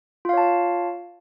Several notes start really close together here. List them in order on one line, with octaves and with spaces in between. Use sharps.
F4 F5 C#5 A5